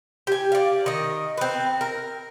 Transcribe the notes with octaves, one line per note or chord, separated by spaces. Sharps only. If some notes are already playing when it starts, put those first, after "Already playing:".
G4 G#5
D5 F5
D#3 D#5
C4 B4
A#4